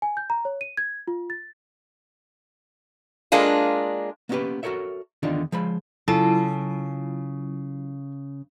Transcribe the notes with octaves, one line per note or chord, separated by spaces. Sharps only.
G#5
G6
A#5
C#5
D#7
G#6
F4
A6
G#3 A#3 D4 F4
A#3 B3 C#4 D#4 G4 B4
F#4 A4 A#4 C#5 E5
E2 D3 D#3 D4 D#4 F4
F3 G#3 C5 B5
C#3 F#3 E4 F4 A4